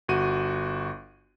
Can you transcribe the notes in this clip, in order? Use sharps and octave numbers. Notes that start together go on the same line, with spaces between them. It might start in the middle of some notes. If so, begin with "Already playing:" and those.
G1 F#4 D#7